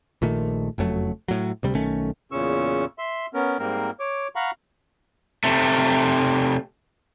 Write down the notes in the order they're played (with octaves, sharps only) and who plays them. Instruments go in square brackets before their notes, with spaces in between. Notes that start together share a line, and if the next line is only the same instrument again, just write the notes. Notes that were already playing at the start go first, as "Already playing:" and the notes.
[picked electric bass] A#1 A#2 D#3 A3
F#1 F2 F#3 A3
A2 F#3
D2 C3 G3
B1 D#3 A3 C#4
[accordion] E2 A#2 C#3 C#4 C#6 E6
E5 C6
B3 C#4 A#4
G#2 G3 A#3 C4 A#4
C#5 D6
F5 F#5 A#5 B5 C#6
[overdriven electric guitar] C3 A3